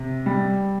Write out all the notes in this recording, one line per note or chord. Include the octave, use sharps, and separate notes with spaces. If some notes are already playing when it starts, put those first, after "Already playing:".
Already playing: C3
G3